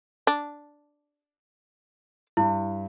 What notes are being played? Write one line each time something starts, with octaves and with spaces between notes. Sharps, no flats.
D4
G2 E4